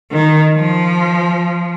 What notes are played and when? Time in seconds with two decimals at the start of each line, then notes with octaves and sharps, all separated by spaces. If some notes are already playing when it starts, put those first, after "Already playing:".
0.12 D#3
0.54 F3